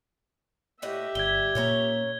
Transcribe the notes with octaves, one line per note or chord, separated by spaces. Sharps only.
A2 G4 D#5 E5 F#5
G1 G3 G#6 G7
A#2 A#3 C#4 C#5 A#5